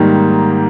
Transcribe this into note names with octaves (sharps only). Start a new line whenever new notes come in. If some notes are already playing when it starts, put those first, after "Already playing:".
Already playing: G#2 D#3 G3 A#3